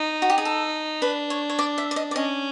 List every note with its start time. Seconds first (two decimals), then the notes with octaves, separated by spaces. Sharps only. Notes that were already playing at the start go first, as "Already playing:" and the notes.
Already playing: D#4
0.22 F#4
0.30 G4
0.38 G#4
0.45 A4
1.02 D4 B4
1.30 C#5
1.50 C#5
1.59 D5
1.78 E5
1.91 D5
1.96 D#5
2.11 D5
2.16 C#4 D#5